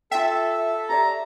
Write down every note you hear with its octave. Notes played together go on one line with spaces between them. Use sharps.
F4 A4 E5 G5
G4 C#5 D5 A#5